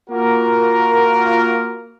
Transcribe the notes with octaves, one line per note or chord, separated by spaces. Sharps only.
A#3 F4 F#4 A#4